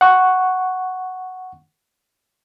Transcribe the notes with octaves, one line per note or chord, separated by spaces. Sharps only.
F#5 C#6